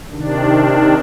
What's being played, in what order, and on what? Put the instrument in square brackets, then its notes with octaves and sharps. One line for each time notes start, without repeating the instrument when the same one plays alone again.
[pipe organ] C3 D#3 D4